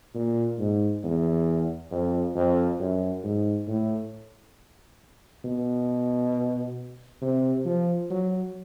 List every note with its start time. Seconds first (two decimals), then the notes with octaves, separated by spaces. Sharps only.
0.15 A#2
0.59 G#2
1.04 E2
1.91 F2
2.35 F2
2.80 F#2
3.24 G#2
3.68 A2
5.45 B2
7.22 C3
7.65 F3
8.10 F#3